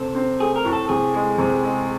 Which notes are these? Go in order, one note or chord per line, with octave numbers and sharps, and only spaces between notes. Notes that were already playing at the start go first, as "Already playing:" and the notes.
Already playing: C3 C4 A4
C4
A3 G#4
A#4
A2
A4
C3 G#4
G#3
C3
G#3